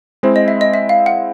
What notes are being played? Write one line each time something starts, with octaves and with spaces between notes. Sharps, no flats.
G#3 C4 E4 C5
D#5
E5
D#5
E5
F5
F#5